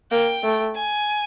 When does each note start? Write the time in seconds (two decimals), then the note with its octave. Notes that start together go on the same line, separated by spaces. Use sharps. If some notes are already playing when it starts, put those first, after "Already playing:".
0.11 A#3 G5
0.43 A3
0.75 G#5